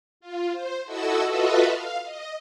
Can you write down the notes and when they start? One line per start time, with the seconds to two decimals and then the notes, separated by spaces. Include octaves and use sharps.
0.20 F4
0.52 C5
0.85 E4 F#4 A4 D#5 E6
1.26 F4 F#4 A4 B4 D#5 E5
1.65 F5
2.04 D#5